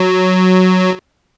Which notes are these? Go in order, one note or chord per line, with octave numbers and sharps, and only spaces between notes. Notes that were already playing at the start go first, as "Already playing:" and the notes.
Already playing: F#3